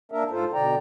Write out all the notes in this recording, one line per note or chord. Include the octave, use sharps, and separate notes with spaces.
A#3 D4 A#4 E5
G#2 F4 A4 C5
B2 D3 D5 G5 A#5